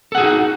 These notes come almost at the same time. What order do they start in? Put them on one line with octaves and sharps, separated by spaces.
A4 F#5 G#4 F#4 D#4